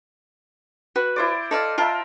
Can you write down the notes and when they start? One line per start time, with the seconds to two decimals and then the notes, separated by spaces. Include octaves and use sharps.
0.96 F#4 B4
1.16 E4 C5 D5
1.51 A4 D5 D#5 F5
1.78 F4 A#4 E5 A5